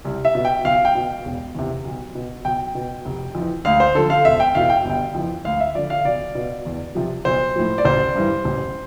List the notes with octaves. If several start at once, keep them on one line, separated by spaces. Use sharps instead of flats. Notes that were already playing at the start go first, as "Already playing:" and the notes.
C2
E5
B2
G5
B1 F5
G5
B2
E1
E2 C3
B1
B2
B1 G5
B2
F1
F2 E3
D2 F5
C5
D3 F3 A4
F5
E1 E5
G5
E2 B2 F5
G5
G1
G5
F2 E3
D2 F5
E5
D3 F3 D5
F5
B1 D5
B2
E2
C3 F3
B1 C5
A2 F3
D5
A1 C5
G2 E3
A1